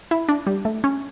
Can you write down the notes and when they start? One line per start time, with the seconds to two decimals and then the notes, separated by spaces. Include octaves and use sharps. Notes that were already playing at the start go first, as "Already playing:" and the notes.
0.11 E4
0.29 D4
0.47 G3
0.65 A3
0.84 C#4